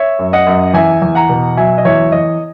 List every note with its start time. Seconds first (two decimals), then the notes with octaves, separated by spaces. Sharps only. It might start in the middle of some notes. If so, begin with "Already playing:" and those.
Already playing: C#5 E5
0.19 F#2
0.33 D#5 F#5
0.47 F#2
0.74 E2 E5 G#5
1.02 E2
1.15 F#5 A#5
1.29 B2
1.57 F#3 E5 G#5
1.78 D#5
1.85 E2 C#5 E5
2.12 E2 D#5